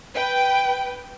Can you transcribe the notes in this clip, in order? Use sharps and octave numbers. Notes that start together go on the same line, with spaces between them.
B4 G5